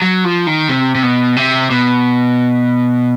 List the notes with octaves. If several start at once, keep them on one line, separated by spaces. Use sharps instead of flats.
F#3
F3
D#3
C3
C3
B2
C3
B2